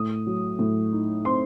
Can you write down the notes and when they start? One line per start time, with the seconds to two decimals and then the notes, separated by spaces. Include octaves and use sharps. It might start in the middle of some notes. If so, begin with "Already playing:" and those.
Already playing: A2 D#6
0.26 F#3
0.59 A2
0.93 D#4
1.25 C4 C6